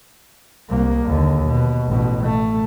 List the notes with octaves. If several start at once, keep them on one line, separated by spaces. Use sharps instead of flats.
C2 A#3
D#2 D3
B2
A1 B2
A3